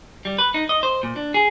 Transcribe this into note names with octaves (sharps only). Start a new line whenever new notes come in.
G3
B4
D#4
D#5
C5
A#2
D4
G#4